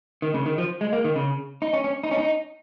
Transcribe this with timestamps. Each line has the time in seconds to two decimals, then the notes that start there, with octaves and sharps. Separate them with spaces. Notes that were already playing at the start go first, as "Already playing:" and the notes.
0.22 D#3
0.34 C#3
0.46 D#3
0.58 F3
0.81 G#3
0.93 A#3
1.04 D#3
1.16 C#3
1.62 D#4
1.73 C#4
1.84 C#4
2.04 D#4
2.11 C#4
2.18 D#4